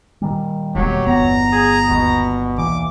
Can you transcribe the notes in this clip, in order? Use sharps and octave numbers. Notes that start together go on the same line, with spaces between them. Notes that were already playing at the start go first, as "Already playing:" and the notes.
A#2 D#3 G3
E1 F#3 A#3 G4
G1 E2 B3 A#5
G#4
D#2 B2
B1 A#2 E3 D6